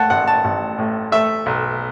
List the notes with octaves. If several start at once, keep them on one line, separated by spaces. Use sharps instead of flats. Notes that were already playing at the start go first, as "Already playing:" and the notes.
Already playing: A3 F#5 A5
A1 F#5
A5
A1
A2
A3 E5
B1